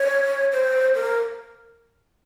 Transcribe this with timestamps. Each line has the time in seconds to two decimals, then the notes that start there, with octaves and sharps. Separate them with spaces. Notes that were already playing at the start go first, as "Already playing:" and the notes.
Already playing: C#5
0.52 C5
0.94 A#4